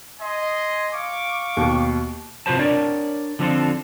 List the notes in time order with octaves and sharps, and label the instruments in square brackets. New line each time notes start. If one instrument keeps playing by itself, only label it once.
[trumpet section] D#5 G#5 C6
F5 C#6 D6
[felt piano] D#2 B2
[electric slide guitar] C3 F4 F#4 B4 C5 A5
D4 A#4 C#5 D5
D3 F3 C4 D4 F4 A4